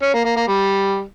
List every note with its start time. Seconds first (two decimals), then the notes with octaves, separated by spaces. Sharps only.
0.02 C#4
0.14 A#3
0.25 A#3
0.36 A#3
0.48 G3